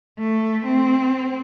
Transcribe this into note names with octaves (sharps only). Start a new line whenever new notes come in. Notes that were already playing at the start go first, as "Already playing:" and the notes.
A3
C4